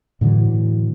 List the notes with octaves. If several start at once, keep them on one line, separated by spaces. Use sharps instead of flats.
A2 D3 E3 F#3